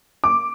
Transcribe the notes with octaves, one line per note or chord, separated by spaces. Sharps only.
D6